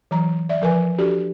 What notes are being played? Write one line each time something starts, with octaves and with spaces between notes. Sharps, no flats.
E3 F#3 A#5
D5 E5
F3 A#4 B4 G#5
D4 F#4 G4 A4 D5